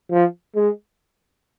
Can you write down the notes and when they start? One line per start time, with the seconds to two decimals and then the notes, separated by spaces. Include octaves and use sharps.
0.11 F3
0.55 G#3